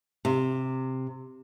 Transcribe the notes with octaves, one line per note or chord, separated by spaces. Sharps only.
C3